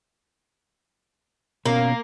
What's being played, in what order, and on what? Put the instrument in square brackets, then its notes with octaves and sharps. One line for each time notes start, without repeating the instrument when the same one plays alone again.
[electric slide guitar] B2 C#4 [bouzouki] A#3